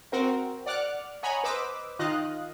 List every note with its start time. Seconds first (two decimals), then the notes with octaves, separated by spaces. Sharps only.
0.12 C4 F#4 A#4 C5
0.66 D5 F#5 D6 F6 F#6
1.23 C#5 D#5 F#5 G#5 A#5 B5
1.44 B4 C5 D#5 D6 E6
1.99 D#3 F4 D#5 F5 F#6